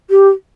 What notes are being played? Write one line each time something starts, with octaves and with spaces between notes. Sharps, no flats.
G4